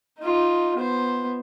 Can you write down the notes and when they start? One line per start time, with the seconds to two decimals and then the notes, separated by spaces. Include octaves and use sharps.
0.19 D#4 F4
0.76 B3 C5